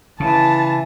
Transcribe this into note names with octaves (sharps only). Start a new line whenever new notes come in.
C#3 E3 A5